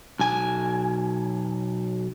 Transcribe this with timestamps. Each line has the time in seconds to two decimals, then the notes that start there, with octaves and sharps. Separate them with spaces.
0.19 B1 G#5